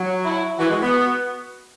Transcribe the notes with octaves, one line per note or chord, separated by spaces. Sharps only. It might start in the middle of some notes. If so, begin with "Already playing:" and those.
Already playing: F#3
E4
E3 F#4
G#3
B3
F#4